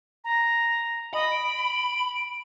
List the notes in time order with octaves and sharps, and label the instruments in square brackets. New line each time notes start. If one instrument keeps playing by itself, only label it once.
[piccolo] A#5
[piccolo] D#5 [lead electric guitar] B5
[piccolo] D7